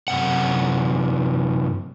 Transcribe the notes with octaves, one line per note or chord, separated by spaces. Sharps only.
F#2 C3 F#5